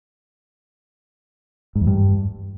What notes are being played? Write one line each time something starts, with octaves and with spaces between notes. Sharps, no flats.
G#2
E2
G2